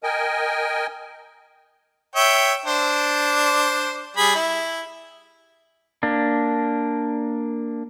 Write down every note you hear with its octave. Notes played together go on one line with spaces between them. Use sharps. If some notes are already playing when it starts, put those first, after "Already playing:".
A#4 D#5 G5 G#5
C#5 E5 G5
D4 C5
G3 G#4 B5
E4
A#3 D4